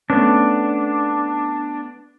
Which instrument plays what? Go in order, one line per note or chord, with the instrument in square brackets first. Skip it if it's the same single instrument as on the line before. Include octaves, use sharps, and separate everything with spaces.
[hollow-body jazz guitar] A3 B3 C#4 [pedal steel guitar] D4